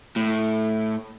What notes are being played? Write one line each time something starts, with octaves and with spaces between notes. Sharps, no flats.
A2